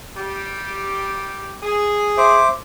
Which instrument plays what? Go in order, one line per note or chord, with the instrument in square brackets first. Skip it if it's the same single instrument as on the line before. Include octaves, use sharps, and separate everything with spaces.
[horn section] G3 G4
G#4
[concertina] C5 E5 D6